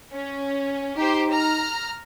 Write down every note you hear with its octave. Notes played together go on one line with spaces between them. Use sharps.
C#4
D#4 G4 C5
A#5 F6